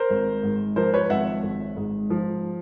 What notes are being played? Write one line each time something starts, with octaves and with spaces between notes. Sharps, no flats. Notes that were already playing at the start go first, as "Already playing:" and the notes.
Already playing: A#4 C5
G#1
G#2
F3 A#4 C5
B4 C#5
G#1 E5 F#5
G#1
G#2
F3